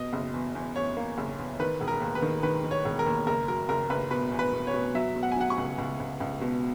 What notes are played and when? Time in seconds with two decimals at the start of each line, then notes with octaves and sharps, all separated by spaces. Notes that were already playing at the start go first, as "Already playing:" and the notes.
Already playing: B2 D#5
0.13 F#1
0.34 E2
0.55 E2
0.76 E2 C#5
0.97 A#3
1.18 F#1
1.38 E2
1.59 D#3 B4
1.81 E1
1.88 A#4
2.01 D#2
2.15 B4
2.22 D#3
2.43 D#3 B4
2.64 D#3
2.71 C#5
2.85 E1
2.99 A#4
3.06 D#2
3.27 F#1 A#4
3.48 F#3 A#4
3.69 F#1 A#4
3.90 F#1 B4
4.11 B2 B4
4.32 E2
4.39 B4
4.53 B2
4.67 C#5
4.74 B2
4.95 F#3 E5
5.16 B2
5.23 F#5
5.32 G#5
5.36 F#3 F#5
5.50 C#6
5.58 C#2
5.78 C#2
6.00 C#2
6.20 C#2
6.41 B2